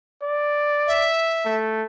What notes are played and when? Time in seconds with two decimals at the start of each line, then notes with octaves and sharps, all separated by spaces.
0.22 D5
0.87 E5
1.45 A3